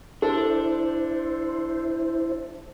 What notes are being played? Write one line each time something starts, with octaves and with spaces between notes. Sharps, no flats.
D4 E4 A4 C5